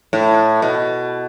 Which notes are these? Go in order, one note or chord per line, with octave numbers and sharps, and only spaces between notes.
A2
B2